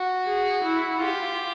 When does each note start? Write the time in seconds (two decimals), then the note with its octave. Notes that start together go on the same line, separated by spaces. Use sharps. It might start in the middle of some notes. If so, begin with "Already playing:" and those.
Already playing: F#4
0.26 G#4
0.63 E4
1.01 F4 G4